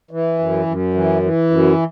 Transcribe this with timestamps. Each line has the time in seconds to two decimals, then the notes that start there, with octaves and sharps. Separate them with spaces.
0.11 E3
0.39 F#2
0.67 F#2
0.94 E3
1.22 E3
1.50 F#2